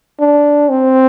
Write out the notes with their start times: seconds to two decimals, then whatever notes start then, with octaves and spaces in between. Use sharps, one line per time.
0.20 D4
0.70 C4